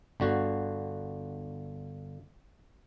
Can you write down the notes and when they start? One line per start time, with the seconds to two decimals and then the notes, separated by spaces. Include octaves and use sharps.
0.20 G1 D3 F#4